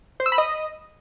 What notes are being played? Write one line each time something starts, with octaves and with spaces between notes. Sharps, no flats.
C5
E6
B5
D#5